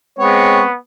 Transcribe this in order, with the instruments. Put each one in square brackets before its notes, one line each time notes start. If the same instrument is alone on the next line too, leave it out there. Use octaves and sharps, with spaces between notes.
[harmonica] G#3 C4 C#5 [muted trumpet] B3